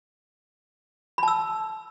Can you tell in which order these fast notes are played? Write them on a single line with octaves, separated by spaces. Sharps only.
B5 A5 E6